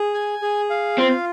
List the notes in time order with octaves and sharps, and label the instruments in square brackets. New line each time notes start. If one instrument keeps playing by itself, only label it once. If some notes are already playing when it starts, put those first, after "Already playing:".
Already playing: [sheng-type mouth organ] G#4
G#5
G#4
F5
[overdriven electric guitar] C4 [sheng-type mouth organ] F4